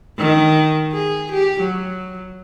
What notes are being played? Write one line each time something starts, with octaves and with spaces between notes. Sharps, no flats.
D#3
G#4
G4
F#3